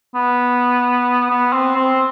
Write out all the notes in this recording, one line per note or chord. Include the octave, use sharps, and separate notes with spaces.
B3
B3
C4
C4